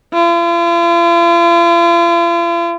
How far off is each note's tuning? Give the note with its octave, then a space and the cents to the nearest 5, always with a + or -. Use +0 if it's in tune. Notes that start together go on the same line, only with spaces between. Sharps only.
F4 -45